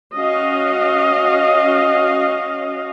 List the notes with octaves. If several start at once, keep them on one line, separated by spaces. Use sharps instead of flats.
C#4 F#4 D#5 F5